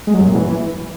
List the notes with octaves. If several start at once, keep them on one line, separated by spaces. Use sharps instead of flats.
G#3
F#3
F#2
A#2
E3